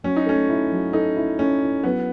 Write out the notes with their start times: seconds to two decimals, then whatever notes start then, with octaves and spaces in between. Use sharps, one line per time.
0.04 F#3 C#4
0.16 D#4
0.26 A3 C#4
0.49 E4
0.71 F#3
0.93 D#4 A4
1.16 E4
1.39 C#4 A4
1.62 E4
1.84 F#3 B3